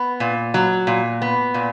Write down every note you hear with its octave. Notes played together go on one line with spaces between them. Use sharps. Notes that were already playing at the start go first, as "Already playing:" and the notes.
Already playing: B3
A#2
F#3
A#2
B3
A#2